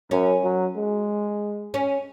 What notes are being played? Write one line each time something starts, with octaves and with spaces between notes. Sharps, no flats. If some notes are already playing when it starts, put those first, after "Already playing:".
F#2 C#4
F#3
G#3
C#4